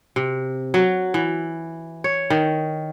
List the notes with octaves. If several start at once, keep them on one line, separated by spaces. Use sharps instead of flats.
C3
F#3
E3
C#5
D#3